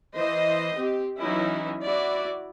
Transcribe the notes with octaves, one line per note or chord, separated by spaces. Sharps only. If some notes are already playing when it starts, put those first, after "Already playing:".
E3 C5 D#5
C4 G4
E3 F#3 C#4 D#4 E4
E4 F#4 D5